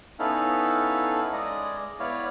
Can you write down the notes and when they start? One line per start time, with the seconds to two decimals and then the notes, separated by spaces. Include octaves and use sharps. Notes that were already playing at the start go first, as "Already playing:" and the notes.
0.19 B3 C#4 D#4 E4 A4 F5
1.33 G#3 G#4 D5 D#5
2.00 B3 E4 C#5 D5 F5